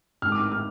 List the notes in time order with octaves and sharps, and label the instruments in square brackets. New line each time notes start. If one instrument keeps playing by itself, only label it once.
[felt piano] G#1 G#2 G#3 D4 [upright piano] F6
[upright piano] D6
F6
F6